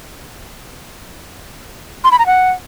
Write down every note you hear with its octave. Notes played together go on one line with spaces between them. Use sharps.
C6
B5
A#5
F#5